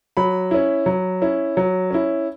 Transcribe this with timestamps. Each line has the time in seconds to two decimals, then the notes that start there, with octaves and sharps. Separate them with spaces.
0.17 F#3 B5
0.51 C#4 E4
0.86 F#3
1.22 C#4 E4
1.57 F#3
1.91 C#4 E4